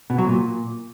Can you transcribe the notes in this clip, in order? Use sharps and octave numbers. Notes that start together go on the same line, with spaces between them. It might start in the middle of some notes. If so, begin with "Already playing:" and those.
B2
F#3
A#2